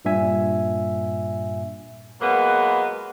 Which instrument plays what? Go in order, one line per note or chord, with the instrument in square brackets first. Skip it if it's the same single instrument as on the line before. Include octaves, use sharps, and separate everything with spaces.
[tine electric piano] G2 A#2 G3 D4 E5 G#5
[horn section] F#3 G#3 A#3 B3 B4